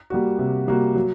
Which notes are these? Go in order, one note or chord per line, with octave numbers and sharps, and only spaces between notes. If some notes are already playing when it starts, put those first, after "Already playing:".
G3 A#3 F#4
C3
G3 A#3 F#4
F#3